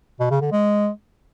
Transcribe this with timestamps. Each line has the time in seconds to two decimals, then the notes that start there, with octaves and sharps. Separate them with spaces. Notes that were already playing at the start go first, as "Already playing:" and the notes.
0.20 B2
0.31 C#3
0.41 D3
0.52 G#3